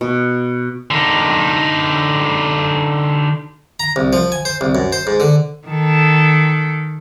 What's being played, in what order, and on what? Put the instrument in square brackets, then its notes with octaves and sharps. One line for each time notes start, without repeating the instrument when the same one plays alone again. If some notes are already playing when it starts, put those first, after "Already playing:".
[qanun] B2
[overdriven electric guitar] D3 D#4
[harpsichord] A#5
C2
F3
G#5
C5
C2
F#2
C5
G#2
D3
[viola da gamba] D#3 A4